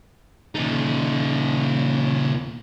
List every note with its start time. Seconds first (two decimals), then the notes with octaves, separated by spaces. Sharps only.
0.55 A#2 C#3 D#4 A4